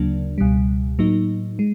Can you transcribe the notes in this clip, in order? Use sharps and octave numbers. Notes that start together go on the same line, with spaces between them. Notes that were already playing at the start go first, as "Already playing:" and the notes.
Already playing: D2 C#3 F#3 A#3 D4
C#2 B2 G3
A2 F#3 A#3 D#4
G#3